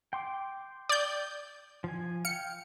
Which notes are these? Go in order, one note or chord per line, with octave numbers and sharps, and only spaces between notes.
G5 C6 D6
D5 G6
F3 G#5
F5 G5 C#7